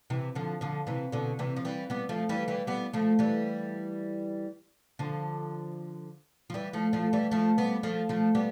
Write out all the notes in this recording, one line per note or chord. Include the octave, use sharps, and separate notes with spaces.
C3 E3
D3 F3
D3 F3
C3 E3
B2 D3
C3 E3
F3
E3 G3
G3 B3
F3 A3
E3 G3
E3 G3
G3 B3
F3 A3
E3 G3
D3 F3
F3
E3 G3
F3 A3
F3 A3
E3 G3
F3 A3
G3 B3
F3 A3
F3 A3
G3 B3